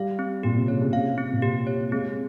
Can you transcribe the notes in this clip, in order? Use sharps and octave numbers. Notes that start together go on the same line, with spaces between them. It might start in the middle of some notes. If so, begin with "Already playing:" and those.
Already playing: G3 F5
C4
A#2 G4
C3
C#3 C#5
C#3
C3 F5
C4
A#2
C3 G4
C#5
G#3 C4